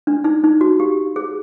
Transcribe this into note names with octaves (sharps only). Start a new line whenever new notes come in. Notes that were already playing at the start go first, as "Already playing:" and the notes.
D4
D#4
D#4
F#4
G4
G#4